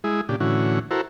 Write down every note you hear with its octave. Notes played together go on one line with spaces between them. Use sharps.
G#3 E4 G#4
A#2 C#3 D4 G4
A2 D3 E3 C#4 F#4
E4 F#4 A4 A#4 C5